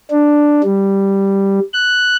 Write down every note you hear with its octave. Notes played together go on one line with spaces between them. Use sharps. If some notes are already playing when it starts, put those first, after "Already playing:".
D4
G3
F#6